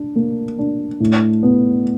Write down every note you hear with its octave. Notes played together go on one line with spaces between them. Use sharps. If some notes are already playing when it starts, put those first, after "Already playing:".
Already playing: D4
A#3
D4
A2
B3